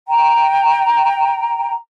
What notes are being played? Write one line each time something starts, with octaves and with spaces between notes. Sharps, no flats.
G5 A#5